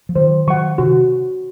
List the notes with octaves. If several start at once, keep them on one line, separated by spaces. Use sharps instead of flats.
F3
D#3 F#3 C5
D#3 F#3 F#5 C#6
C3 D#3 F#4